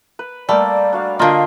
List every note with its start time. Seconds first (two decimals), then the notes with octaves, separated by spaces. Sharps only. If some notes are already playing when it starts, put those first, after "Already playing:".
0.19 B4
0.49 G3 A3 A#3 D5 G5
0.93 D4 F#4 F5
1.19 D3 A#3 F4 D#5 F5 G5